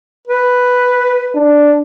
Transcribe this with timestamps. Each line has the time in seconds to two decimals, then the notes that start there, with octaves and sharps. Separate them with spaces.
0.28 B4
1.35 D4